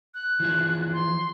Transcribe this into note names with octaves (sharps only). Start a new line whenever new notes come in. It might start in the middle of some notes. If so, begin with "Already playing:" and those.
F#6
E3 F3 G#4
C6